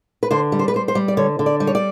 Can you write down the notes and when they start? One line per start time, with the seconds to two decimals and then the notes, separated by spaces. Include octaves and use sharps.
0.23 B4
0.31 D3 C5
0.52 G3
0.59 C5
0.68 B4
0.74 G3 C5
0.88 C5
0.95 G3
1.08 D5
1.17 D3 C#5
1.39 D3
1.46 D5
1.60 G3
1.67 C#5
1.75 D5